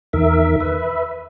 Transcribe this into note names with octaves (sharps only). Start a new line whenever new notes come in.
E2 D#3 A#4 E5
B4 E5